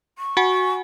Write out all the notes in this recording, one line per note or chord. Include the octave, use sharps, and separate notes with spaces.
C#6
F#4 F#5 G#5